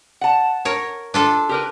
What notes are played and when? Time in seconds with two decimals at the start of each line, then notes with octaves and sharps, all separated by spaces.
0.21 F#5 A5
0.65 A#4 C#5
1.14 D4 F4 A4
1.49 G4 A#4 B4